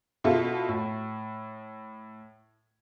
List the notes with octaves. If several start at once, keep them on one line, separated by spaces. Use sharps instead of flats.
B2 E4 F4 A4
A2